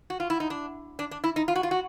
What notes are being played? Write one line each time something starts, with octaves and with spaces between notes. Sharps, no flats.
F#4
F4
E4
D#4
D4
D4
D4
E4
D#4
F4
F#4
F4
F#4